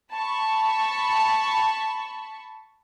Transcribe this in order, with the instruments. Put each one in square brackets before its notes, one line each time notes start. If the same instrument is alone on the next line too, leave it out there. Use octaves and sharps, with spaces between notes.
[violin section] A5 B5 C#6